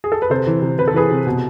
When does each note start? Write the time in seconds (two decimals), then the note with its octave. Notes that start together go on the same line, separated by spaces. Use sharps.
0.04 G#4
0.12 A4
0.22 B4
0.30 C3 A4 C5
0.47 E3
0.62 C3
0.78 C3 B4
0.88 A4
0.94 E3 G#4 B4
1.11 C3
1.27 B2